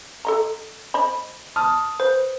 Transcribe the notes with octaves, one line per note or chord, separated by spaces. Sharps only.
A4 D#5 A#5
C5 D#5 B5
A5 D#6 F6
B4 C5